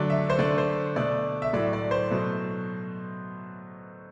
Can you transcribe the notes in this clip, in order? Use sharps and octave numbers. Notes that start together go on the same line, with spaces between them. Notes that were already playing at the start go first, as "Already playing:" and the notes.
Already playing: D3 F#3 A3 D5
E5
C5
D3 A3 D5
C5
B2 A3 D5
E5
A2 F#3 A3 D5
D5
C5
B2 F#3 A3